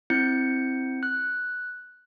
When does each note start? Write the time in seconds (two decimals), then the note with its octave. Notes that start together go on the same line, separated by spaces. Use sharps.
0.10 C4 E4 G6 C#7
1.03 F#6